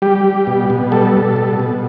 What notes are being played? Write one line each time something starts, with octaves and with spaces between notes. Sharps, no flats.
G3 G4
G3
B2
B2
G3 A4
G3
B2
B2